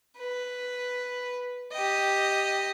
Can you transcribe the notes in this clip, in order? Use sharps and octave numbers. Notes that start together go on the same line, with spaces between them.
B4
G4 D#5